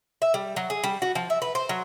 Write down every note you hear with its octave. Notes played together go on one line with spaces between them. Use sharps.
E5
G3
F#3
G#4
G3
F#4
F3
E5
B4
C5
F#3